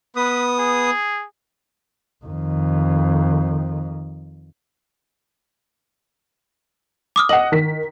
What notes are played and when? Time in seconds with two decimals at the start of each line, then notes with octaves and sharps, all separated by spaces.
0.16 B3 B4 D#6
0.59 G#4
2.25 F2 D#3
7.16 D6 D#6 F6
7.29 D#5 F#5 F#7
7.52 D#3 B6